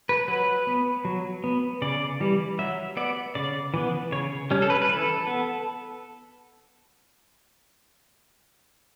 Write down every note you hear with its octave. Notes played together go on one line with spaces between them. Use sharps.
B4
F#3 B4
B3
F#3
B3
C#3 D5
E3 G3
F#3 E5
B3 D5
C#3 D5
E3 B3
C#3 C#5
G3 C#4
A4
B4
B4
E3 A4
B3